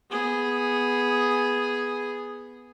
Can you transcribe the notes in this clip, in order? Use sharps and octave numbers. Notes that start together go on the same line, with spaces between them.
B3 G#4